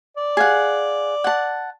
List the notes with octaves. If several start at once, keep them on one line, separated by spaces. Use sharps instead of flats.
D5
G#4 F5 F#5
F#5 A5